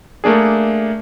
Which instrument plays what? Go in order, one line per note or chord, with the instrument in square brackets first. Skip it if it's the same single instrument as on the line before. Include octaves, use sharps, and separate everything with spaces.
[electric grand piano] A3 A#3 D4 G#4